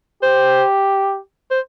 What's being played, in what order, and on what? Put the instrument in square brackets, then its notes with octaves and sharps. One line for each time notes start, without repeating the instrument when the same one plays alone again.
[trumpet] G4 [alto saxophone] C5
[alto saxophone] C5